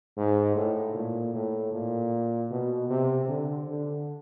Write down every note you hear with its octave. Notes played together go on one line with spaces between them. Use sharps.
G#2
A2
A#2
A2
A#2
B2
C3
D3
D3